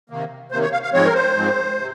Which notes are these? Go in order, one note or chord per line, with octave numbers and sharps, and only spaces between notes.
C3 D#3 A#3
C3 D#3 A#3 C5
C#5
F5
F5
G#2 F3 G#3 C4 C#5
A#4
C5
G#2 F3 G#3 C4
C3